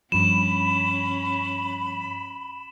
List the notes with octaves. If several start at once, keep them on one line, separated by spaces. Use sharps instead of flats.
G2 F3 C#4 B5 E7